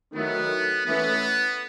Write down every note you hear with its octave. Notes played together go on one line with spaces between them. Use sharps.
D#3 F#3 A3 B3 E4
E3 A3 B3 C#4 E4